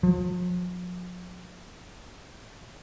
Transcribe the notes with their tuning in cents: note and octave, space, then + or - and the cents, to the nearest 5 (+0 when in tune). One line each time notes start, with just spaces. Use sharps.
F3 +45